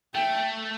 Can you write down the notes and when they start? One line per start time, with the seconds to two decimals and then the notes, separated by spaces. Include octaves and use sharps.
0.14 A3 G5